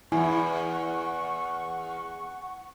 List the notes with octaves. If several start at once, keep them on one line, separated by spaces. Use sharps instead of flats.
E2 E4 F#5 G#5 C#6